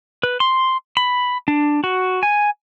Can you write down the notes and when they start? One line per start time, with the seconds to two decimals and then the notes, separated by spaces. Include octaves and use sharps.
0.23 B4
0.40 C6
0.97 B5
1.48 D4
1.84 F#4
2.23 G#5